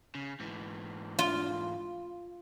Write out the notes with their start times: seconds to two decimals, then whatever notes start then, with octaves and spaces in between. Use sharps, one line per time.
0.15 C#3
0.40 G#2 E3
1.19 F4